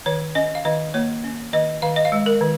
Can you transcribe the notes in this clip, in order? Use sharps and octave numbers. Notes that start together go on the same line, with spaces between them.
D#3 C#5
C#4 D#5
F5
D#3 D#5
A#3 C#5
C#4
D#3 D#5
D#3 F5
D#5
F5
G#3
A#4
D#3